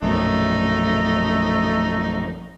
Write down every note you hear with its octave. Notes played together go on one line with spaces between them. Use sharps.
A#1 F#2 B2 A3 D#4